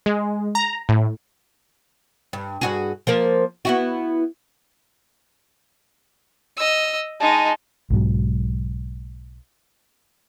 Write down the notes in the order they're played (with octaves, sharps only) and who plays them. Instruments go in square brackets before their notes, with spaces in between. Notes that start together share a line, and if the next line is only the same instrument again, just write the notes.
[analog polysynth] G#3
A#5
A2
[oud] G2
G2 F#4 G#4
F3 A#3 A#4
B3 E4 F#4
[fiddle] D#5 E6
[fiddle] G#3 D#4 [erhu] A5
[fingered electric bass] B1 G#2 F#3